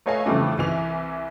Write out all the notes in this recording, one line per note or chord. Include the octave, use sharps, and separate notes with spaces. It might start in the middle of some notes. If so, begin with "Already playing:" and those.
A3 B4 C#5 D#5 F5 G#5
F2 C#3 E3 G3 A3 D4
C2 E3 G#5 F7